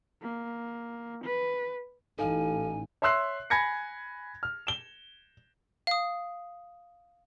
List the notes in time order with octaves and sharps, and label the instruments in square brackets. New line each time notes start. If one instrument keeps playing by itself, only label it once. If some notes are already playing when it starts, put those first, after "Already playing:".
[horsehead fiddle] A#3
B4
[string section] A1 [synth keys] D#4 [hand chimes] A4 F5 [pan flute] G#5
[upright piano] C#5 E5 C6 E6 F#6 C7
G#5 B5 G#6 A#6 C#7
F6
E7 G7
[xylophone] F5 D#6